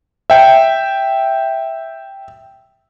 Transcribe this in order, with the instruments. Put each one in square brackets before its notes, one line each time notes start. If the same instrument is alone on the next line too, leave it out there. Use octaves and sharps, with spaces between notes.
[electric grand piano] E5 G5